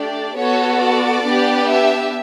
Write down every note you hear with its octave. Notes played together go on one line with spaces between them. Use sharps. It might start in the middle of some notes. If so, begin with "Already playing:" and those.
Already playing: A3 D4 G4 D5
B3 F#4 A4 C#5
D5
B3 D4 G4
E5